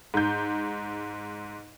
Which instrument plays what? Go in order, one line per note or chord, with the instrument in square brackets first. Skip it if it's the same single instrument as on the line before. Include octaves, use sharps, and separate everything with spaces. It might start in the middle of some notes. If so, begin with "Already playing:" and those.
[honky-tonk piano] G#2 G6